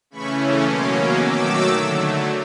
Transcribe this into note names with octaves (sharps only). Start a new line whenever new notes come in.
C#3 E3 A3 C#4 B5 C#6
B2 F#3 A#3 C#4 C6 D6
D#3 F#3 A3 D6 E6
D3 F#3 A3